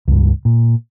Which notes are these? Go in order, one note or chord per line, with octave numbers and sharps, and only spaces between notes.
C#2 G2
A#2